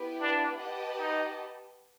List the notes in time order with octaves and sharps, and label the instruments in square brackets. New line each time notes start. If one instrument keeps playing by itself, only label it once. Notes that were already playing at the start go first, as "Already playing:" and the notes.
Already playing: [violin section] B3 E4 G4 B4
[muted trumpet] D4
[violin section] G4 B4 D#5 F#5 A5
[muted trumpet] D#4